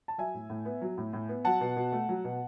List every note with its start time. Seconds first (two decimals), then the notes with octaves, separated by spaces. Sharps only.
0.08 A5
0.18 F#3 E5 G#5
0.34 A2
0.50 A2
0.65 B3
0.81 F#3
0.98 A2
1.13 A2
1.29 B3
1.45 F#3 F#5 A5
1.61 B2
1.76 B2
1.92 A3
2.09 F#3
2.24 B2